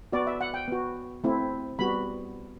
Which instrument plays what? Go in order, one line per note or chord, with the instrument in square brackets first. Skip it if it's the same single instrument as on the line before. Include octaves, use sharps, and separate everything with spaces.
[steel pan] B3 F#4 D5
E5
F#5
G5
B3 F#4
A3 C4 E4
G3 B3 F#4 B5